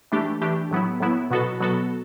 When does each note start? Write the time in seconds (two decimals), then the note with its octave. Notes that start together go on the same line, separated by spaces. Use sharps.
0.12 E3 A3 D4 G4
0.41 E3 A3 D4 G4
0.71 A2 F#3 B3 E4
1.00 A2 F#3 B3 E4
1.31 B2 F#3 B3 F#4 A4
1.60 B2 F#3 B3 F#4 A4